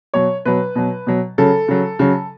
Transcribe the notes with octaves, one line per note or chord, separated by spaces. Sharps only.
B2 F#3 C#5
B2 F#3 B4
B2 F#3
B2 F#3
C#3 F#3 A4
C#3 F#3
C#3 F#3